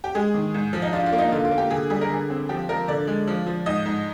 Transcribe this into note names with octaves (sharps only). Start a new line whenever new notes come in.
G4
G#3 G#4
D#3
G#2
F3
D#4
D4 F4
F4
A#3
D#4
D3 F4
F4
A#3
G4
D3 G#4
G3 G#4
A#4
D3 G#4
C4
F3 G4
F3 A#4
D3 D5
G#3
F3
F3
G#2 D#5
G#2